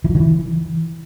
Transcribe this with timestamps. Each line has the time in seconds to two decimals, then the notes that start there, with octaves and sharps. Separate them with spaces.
0.04 E3
0.10 F3
0.15 D#3
0.20 E3